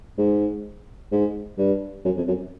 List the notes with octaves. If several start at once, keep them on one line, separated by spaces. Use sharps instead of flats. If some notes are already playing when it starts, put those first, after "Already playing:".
G#2
G#2
G2
F#2
F2
F#2